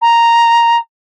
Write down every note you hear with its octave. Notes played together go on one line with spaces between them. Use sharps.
A#5